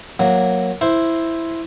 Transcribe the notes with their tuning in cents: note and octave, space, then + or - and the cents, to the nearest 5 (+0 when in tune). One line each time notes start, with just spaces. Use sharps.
F#3 -10 A#3 +0
E4 +0 C5 +0